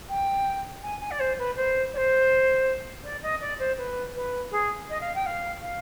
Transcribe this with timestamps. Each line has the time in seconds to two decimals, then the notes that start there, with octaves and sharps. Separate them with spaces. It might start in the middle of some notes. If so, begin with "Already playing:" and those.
0.09 G5
0.83 G#5
1.01 G#5
1.11 D5
1.20 C5
1.38 B4
1.57 C5
1.93 D5
1.97 C5
3.04 D5
3.22 D#5
3.41 D5
3.59 C5
3.78 B4
4.14 B4
4.51 G#4
4.89 D#5
5.01 F5
5.15 G5
5.26 F5
5.62 F5